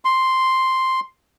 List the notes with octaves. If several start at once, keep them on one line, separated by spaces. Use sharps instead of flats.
C6